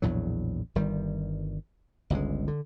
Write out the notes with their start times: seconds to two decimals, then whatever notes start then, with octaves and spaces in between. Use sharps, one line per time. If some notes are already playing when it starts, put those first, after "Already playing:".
0.02 A#1 E2 A2 F#3
0.75 G1 D#3 G3
2.10 G1 C#2 D3 G#3
2.48 D3